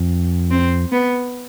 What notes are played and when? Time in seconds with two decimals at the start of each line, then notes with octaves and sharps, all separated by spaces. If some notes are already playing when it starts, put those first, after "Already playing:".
Already playing: F2
0.51 C4
0.92 B3